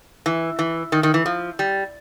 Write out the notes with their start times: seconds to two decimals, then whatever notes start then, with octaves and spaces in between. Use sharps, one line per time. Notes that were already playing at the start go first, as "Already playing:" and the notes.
0.26 E3
0.59 E3
0.92 D#3
1.03 D#3
1.14 E3
1.26 F3
1.59 G3